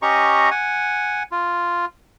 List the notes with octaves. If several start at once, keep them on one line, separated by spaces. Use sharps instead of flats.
C#4 G4 D#5 A#5 C#6
F#5 G#5
F4